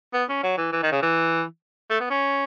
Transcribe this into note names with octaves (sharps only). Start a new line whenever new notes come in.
B3
C#4
F#3
E3
E3
D#3
C#3
E3
A3
B3
C#4